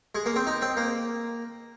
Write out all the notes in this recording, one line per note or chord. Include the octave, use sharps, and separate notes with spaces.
G#3
A#3
C4
D#4
C4
A#3